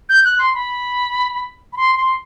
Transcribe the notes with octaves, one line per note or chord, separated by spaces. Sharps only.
G6
F#6
C6
B5
B5
C6
C6